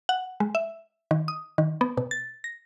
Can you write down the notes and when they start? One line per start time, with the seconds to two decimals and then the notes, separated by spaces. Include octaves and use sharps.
0.09 F#5
0.40 G#3
0.55 E5
1.11 D#3
1.28 D#6
1.58 D#3
1.81 B3
1.97 B2
2.11 A6
2.44 A#6